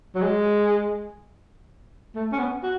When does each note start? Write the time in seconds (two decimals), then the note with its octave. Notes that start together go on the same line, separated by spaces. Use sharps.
0.15 F#3
0.22 G#3
2.15 A3
2.32 C#4
2.39 B3
2.63 F#4